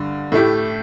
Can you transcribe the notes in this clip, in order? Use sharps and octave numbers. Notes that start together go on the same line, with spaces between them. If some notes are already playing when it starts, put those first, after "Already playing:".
Already playing: G2 D3
A2 A3 E4 G4